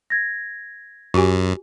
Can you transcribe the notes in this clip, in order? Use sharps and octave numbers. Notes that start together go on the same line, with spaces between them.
G#6 A#6
F#2 F#4 G4 G#5